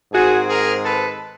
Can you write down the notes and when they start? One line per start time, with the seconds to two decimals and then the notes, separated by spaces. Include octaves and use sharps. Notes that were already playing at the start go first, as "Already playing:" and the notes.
0.12 G#2 D#3 G#3 C4 F#4 G#4
0.47 G#4 A#4
0.83 A4 B4